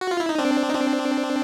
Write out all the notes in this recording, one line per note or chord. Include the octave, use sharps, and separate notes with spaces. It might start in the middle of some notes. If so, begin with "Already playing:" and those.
F#4
F4
E4
D#4
C4 D4
D#4
C4 D4